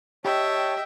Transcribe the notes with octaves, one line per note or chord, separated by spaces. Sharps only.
G4 C#5 D#5 E5 G5 A5